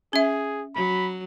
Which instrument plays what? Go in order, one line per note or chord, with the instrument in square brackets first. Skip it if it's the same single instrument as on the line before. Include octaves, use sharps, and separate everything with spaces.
[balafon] C#4 E5 [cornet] G#4
[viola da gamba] F#3 [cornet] B5